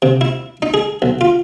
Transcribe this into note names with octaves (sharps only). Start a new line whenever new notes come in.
C3
E4
D#4
G#4
B1
F4